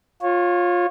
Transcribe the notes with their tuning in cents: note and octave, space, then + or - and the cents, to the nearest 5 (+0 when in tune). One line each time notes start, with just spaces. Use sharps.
F4 +15 C#5 -20